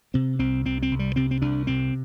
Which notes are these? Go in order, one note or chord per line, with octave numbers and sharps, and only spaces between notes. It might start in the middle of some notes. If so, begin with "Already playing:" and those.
C3 C4
C2 C4
C3 C4
C4
C2
G3
C3 C4
C4
C2 D4
C3 C4